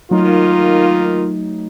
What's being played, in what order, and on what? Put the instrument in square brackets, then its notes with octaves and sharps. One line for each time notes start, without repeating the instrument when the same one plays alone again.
[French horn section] D#3 A#3 F4 [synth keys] F#3 A3 D#4